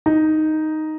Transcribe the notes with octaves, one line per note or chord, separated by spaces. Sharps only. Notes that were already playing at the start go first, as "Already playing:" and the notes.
D#4